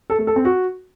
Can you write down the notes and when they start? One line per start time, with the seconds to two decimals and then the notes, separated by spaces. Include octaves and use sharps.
0.10 A4
0.18 A3
0.27 A4
0.36 C4
0.45 F#4